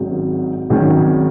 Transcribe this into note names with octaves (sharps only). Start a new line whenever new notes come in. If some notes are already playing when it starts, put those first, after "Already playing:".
Already playing: G#1 G#2 D#3 F#3 C#4
G#1 G#2 D#3 F#3 C#4